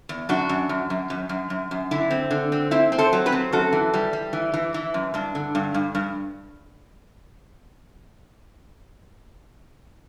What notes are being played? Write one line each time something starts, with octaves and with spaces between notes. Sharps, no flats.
E2
F#2 D4 F#4
F#2
F#2
F#2
F#2
F#2
F#2
F#2
D3 E4
C4
D3
C4
C4 E4
C4
A4 C5
F#3
G4 B4
C4
F#2 F#4 A4
E3
G3
G3
E3
E3
E3
F#2
G2 D4
D3
G2
G2
G2